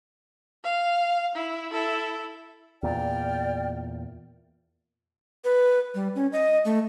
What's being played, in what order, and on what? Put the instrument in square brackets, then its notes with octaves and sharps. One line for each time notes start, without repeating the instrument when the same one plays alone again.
[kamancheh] F5
E4
E4 A4
[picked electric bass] E2 A#2 [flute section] D5 G5 F6
[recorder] B4
G3
C#4
D#5
A3